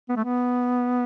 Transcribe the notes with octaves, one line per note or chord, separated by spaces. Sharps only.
B3
A3
B3